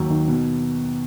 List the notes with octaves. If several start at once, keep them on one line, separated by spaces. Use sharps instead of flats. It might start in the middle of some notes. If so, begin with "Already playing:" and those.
Already playing: D#2 F#3
D#3
B2